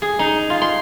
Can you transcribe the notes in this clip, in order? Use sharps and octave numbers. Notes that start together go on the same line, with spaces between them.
G#4
D#4
F4
C6